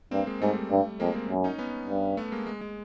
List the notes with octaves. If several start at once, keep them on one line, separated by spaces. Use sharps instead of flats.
G2 A#3 C4
G#3 A#3
G#2 G3 A3
G2
F2 G#3 A#3
A#3 C4
F#2
C#4 D#4
B3 C#4
G2
A3 B3
G#3 A#3
G#3
G#3